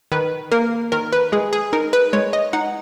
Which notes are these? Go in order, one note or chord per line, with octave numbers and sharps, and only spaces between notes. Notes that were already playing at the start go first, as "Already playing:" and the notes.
D#3 B4
A#3 A#4
D#3 A#4
B4
G#3 G#4
G#4
D#4 A#4
B4
G#3 C#5
D#5
D#4 F#5